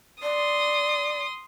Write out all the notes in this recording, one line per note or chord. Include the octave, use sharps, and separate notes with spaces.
D5 C6 D#6